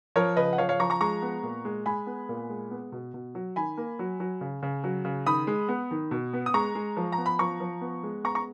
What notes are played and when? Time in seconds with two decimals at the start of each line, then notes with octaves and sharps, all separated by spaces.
0.16 F3 A#4 C#5
0.36 C#3 B4 D#5
0.53 F#5
0.58 F3 C#5 F5
0.69 C#5 F5
0.80 F3 A#5 C#6
0.90 A#5 C#6
1.01 G#3 A#5 C#6
1.22 B3
1.43 A#2
1.65 G#3
1.86 G#3 G#5 B5
2.07 B3
2.29 A#2
2.50 G#3
2.71 B3
2.92 B2
3.14 B2
3.35 F#3
3.56 D#3 G#5 B5
3.77 A#3
3.99 F#3
4.20 F#3
4.41 C#3
4.63 C#3
4.84 F#3
5.05 C#3
5.26 D#3 B5 D#6
5.47 G#3
5.69 B3
5.91 D#3
6.11 B2
6.33 B3
6.46 D#6
6.54 G#3 A#5 C#6
6.75 G#3
6.97 F3
7.12 A#5
7.18 B3
7.26 B5
7.39 F3 A#5 C#6
7.60 F3
7.81 B3
8.03 G#3
8.24 B3 A#5 C#6
8.35 A#5 C#6